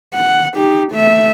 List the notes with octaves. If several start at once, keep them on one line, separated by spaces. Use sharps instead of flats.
F#5
D#4 G4
A3 E5